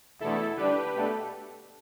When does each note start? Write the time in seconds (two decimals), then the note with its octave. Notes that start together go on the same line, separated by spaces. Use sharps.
0.21 E2 B2 A3 D4 E4 A4
0.57 D3 G3 D4 G4 B4
0.93 B2 A3 D4 A4